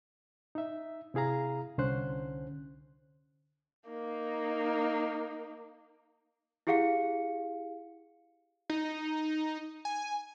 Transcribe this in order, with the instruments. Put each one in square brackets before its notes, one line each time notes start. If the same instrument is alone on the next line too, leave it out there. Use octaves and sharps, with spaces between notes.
[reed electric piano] D#4 E5
C3 E4 G#4 F5 A#5
C2 D3 C#4 C5 F#6
[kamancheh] A#3 D#4
[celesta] E4 G4 G#4 F5 F#5 C#7
[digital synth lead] D#4
G#5